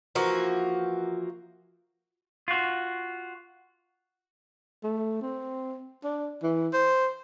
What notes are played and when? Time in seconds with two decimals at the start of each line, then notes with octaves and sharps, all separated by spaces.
0.15 E3 F3 A#3 F#4
2.48 F4 F#4
4.84 A3
5.22 C4
6.04 D4
6.43 E3
6.73 C5